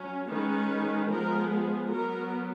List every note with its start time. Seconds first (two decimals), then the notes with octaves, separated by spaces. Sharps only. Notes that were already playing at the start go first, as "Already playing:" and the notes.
Already playing: F#3 C#4
0.28 D#3 G#3 C#4 B4
1.09 F3 G#3 B3 A#4
1.51 G#4
1.91 F#3 B3 A#4